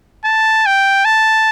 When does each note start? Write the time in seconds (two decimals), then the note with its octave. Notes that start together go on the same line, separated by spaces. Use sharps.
0.25 A5
0.66 G5
1.05 A5